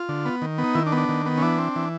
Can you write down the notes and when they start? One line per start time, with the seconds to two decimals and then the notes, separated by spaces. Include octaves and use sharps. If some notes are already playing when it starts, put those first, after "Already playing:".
Already playing: F4
0.09 D3
0.25 B3
0.42 D#3
0.58 B3
0.64 D#4
0.75 D#3 E4
0.86 D4
0.92 B3
0.97 D4
1.09 D#3
1.26 B3
1.38 C#4
1.42 E3 D4
1.58 C4
1.76 E3